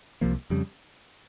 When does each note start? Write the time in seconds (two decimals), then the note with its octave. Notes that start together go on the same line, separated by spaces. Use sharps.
0.21 C2 C3 F3 A#3
0.50 F2 C#3 G3